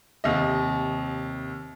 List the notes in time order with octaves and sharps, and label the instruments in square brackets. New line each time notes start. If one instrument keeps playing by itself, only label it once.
[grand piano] D#2 C3 D#5